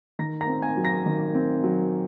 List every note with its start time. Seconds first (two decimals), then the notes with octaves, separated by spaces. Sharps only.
0.19 D#3 A#5 A#6
0.41 A#5 A#6
0.48 C4
0.62 G#5 G#6
0.77 F#3
0.84 A#5 A#6
1.06 D#3
1.35 C4
1.64 F#3